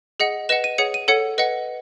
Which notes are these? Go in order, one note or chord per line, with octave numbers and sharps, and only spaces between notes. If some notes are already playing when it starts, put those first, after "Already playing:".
G#4 D#5 F#5
B4 D#5 F#5 E7
D#7
G#4 C#5 F#5 C#7
D#7
A4 C#5 F#5 C#7
B4 D#5 F#5